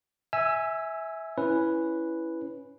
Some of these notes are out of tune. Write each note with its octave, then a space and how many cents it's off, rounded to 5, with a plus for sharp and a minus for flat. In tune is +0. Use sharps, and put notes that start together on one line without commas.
E5 -15 G#5 +0 E6 +20
C#4 +0 E4 +0 B4 +0